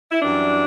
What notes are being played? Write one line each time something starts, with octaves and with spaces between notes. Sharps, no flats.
E4
F#2 E3 G3 D4